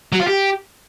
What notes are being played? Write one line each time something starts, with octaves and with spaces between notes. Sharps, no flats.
F#3
F4
G4